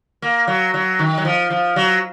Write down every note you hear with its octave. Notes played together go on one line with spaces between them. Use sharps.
A#3
F#3
F#3
D#3
F#3
F3
F3
F#3